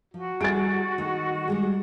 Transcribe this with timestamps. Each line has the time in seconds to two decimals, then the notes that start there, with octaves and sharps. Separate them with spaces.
0.14 F3 F#4
0.41 G3 E4 G#4 A6 D7
0.98 D#3 A3
1.48 G3 G#3 G#4